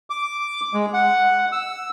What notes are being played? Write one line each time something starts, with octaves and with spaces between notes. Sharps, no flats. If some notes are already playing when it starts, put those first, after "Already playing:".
D6
G#3
F#5
E6